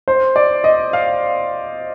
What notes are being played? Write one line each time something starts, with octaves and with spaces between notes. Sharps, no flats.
C5
D5
D#5
F5